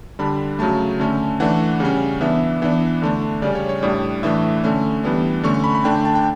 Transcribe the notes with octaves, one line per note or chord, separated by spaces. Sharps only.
D3 G3 D4 B5
C#3 F#3 A3 A5
D3 A3 C#4
E3 A3 D4 F#5
C#3 G3 C#4
E3 B3 D4 E5
E3 B3 D4
D3 A3 D4
C#3 G3 C#4 D5
C#5
C#5
A2 G3 D4 D5
A2 E3 A3 D4 E5
D3 A3 C#4
E3 G3 B3 D4
D3 A3 C#4 C#6
C#6
B5
B5
D3 A3 D4 G5
G5
A5
G5